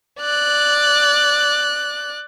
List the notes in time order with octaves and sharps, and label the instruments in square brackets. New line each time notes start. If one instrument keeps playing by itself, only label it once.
[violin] D5 F#6